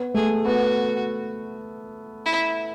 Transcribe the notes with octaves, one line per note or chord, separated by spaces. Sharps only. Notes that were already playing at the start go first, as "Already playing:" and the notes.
Already playing: B3
A3 G#4
B3 F#4
E4